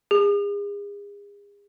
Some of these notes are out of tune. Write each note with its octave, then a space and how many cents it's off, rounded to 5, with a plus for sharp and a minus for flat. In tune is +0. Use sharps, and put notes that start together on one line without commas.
G#4 -40